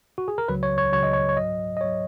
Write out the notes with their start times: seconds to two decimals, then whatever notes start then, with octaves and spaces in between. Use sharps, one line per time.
0.18 F#4
0.28 G#4
0.38 A#4
0.48 C#2 C#3 F#3 B4
0.63 C#5
0.78 C#5
0.93 C#2 C#3 F#3 C#5
1.03 D#5
1.13 C#5
1.29 C#5
1.37 G#2 F#3 D#5
1.77 D#5
1.81 G#2 F#3 C#5